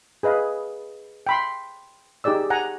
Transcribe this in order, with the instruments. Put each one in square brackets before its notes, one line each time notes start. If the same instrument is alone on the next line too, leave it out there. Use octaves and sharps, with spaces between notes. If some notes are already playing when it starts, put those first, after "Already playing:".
[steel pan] G#4 B4 D#5 F5
G5 B5 C6
D#4 G4 G#4 D5 E6
F#5 G#5 A#5